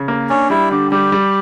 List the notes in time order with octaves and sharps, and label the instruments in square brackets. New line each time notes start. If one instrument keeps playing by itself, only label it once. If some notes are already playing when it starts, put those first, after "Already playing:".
Already playing: [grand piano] C#3
A#3
[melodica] C#4 [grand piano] D4
[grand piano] G3 [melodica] E4
[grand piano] D3 [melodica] G4
[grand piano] G3 [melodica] G4
[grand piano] G3